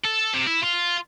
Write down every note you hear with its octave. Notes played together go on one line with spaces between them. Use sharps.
A4
C3
E4
F4